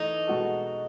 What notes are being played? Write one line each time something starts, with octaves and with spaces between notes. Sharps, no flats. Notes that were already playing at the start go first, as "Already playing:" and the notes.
Already playing: E3 A3 D#4 E4 A4
B2 G#3 B3 F#4 A4